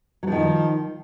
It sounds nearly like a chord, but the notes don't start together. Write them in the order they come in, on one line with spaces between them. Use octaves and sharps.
F#3 F3 D#3